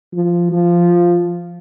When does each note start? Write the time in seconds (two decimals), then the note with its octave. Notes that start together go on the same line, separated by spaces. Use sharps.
0.13 F3
0.52 F3